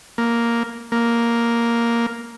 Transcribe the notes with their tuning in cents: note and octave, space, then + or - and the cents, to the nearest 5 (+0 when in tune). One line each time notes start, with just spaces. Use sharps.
A#3 +0
A#3 +0